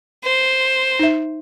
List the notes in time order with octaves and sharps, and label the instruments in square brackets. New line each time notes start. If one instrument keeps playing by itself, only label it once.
[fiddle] C5
[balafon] D#4 E5